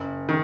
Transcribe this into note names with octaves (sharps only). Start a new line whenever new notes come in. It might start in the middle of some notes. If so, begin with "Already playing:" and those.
Already playing: F#1
D#3